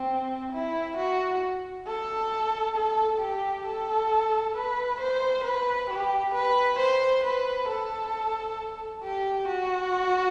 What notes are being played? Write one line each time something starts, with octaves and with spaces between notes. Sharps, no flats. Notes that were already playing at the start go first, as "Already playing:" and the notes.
Already playing: C4
E4
F#4
A4
A4
G4
A4
B4
C5
B4
G4
B4
C5
B4
A4
G4
F#4